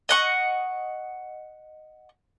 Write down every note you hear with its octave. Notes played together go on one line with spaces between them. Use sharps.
D#5 F#5 C#6